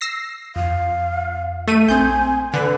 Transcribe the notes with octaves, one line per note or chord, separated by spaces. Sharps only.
E6 A#6 C7
F2 F5
A3 D#7
A#1 C4 G#5 G6
D3 B4 F#6